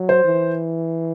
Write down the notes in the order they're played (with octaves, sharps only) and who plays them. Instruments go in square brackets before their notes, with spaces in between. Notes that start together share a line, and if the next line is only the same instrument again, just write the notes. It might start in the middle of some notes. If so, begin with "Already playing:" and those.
Already playing: [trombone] F#3
[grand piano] C5
[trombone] E3